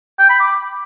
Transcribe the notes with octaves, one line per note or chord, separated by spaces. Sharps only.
G5
B5
D6